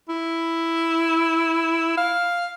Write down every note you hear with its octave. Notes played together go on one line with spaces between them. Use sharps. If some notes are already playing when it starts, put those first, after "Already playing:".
E4
F5